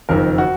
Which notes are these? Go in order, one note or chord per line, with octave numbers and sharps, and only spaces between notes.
F#1 F2 D#3 A#4
F#4